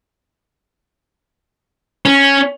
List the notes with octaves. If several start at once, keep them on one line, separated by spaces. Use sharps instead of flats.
C#4